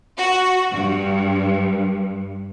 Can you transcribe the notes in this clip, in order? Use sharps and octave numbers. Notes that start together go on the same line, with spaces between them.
F#4
G2